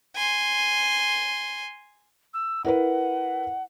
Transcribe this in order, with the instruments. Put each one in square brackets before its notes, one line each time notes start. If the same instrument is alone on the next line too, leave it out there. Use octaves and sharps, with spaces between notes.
[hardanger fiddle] G#5 C6
[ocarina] E6
[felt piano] E4 A#4 B4 [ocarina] F#5